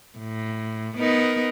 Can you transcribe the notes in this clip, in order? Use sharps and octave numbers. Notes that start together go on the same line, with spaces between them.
A2
B3 D#4 A#4